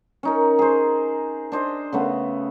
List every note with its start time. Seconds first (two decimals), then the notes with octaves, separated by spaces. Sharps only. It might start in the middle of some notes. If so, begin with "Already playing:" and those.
0.23 C#4 D#4 A#4
0.59 G#4 C5
1.52 D4 C5 D#5
1.93 C#3 A3 B3